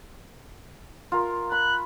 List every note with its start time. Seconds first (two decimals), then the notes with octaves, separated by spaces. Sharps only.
1.12 F4 A#4
1.52 B5 F#6